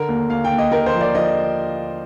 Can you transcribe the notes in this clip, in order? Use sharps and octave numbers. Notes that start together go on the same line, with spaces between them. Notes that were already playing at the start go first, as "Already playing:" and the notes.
Already playing: D3 A#4
D#2
D#2 F5
G5
D#2
D#5
D#2 A#4
C5
F3
D5
F3 D#5